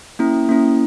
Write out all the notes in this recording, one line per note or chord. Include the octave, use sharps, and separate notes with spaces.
A#3 C#4 E4
A#3 C#4 E4